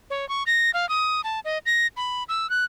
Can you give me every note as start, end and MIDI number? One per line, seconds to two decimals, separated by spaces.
0.10 0.28 73
0.29 0.43 85
0.47 0.71 94
0.74 0.88 77
0.89 1.21 87
1.24 1.40 81
1.45 1.58 75
1.66 1.87 94
1.97 2.23 83
2.29 2.49 88
2.50 2.65 90